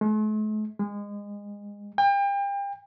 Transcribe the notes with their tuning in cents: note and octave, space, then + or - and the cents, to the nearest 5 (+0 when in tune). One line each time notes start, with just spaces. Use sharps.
A3 -45
G#3 -25
G5 +35